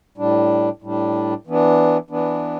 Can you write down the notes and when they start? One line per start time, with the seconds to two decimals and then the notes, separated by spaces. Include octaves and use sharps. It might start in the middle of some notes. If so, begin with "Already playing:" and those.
0.18 A2 G3 D4
0.82 A2 G3 D4
1.47 E3 B3 D4
2.10 E3 B3 D4